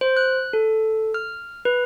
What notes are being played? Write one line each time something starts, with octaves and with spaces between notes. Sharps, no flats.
C5
F#6
A4
F6
B4